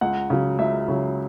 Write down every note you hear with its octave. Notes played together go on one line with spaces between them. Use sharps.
C#2 F#5
C#3 F#3
C#2 E5
C#3 F#3